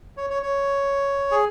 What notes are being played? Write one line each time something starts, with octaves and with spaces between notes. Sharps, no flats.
C#5
C#5
C#5
G#4